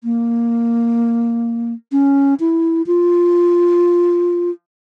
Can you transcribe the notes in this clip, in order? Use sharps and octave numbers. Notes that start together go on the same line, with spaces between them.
A#3
C#4
E4
F4